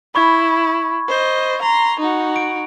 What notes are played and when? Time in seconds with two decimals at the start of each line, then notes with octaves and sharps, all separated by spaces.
0.15 E4 B5 C#6 G#6
1.09 C5 D#5
1.62 A#5 C6 F7
2.00 D#4 F#4
2.36 D7